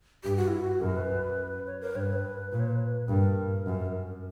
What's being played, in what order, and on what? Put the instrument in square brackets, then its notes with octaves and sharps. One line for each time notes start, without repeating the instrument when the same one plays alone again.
[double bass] G2 [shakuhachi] G4
[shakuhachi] F#4
E4
F#4
[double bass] F#2 [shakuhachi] A#4
[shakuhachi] B4
C#5
A#4
[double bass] G2 [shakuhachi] C#5
[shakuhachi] B4
[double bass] A#2 [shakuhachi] B4
[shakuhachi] C#5
B4
[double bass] G2 [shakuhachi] A#4
[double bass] F#2